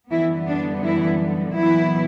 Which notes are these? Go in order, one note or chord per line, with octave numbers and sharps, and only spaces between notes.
F#2 D3 E3 G3 B3 E4
D4
E3 E4
A#2 E3 F#3 B3 E4